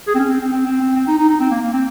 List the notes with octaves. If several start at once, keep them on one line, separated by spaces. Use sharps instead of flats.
G#4
C4
C#4
C4
C4
C4
C4
C4
C4
D#4
D#4
D#4
C4
A#3
A#3
C4